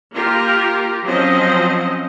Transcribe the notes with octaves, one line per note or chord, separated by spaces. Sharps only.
A#3 F4 G4 A#4
F3 F#3 C4 C#4 C5 D#5